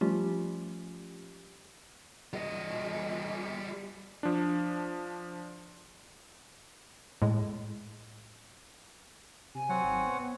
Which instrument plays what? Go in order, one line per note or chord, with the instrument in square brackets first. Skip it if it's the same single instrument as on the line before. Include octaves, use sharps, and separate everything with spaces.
[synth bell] F3 G3 A3 C#4 F4 G4
[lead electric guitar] G3 D#5
[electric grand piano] F3 D4
[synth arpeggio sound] A2 G#3
[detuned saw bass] C3 [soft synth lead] G#5
[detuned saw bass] F#3 [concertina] C4 C#5 F#5
[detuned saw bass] G#1
B3